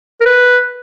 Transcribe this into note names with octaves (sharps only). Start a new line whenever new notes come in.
A#4
B4